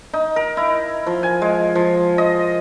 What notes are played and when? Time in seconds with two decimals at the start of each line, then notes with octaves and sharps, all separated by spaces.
0.13 D#4
0.36 A#4
0.57 E4
1.06 F3
1.23 G#5
1.42 G#3
1.75 F3
2.18 D#5